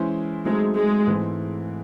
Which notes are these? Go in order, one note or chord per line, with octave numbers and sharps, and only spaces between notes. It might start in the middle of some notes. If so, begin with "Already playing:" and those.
Already playing: E3 G#3 C#4 E4 C5
F#3 G#3 A3 C4 D#4
G#3
G#2 E3 A3 C4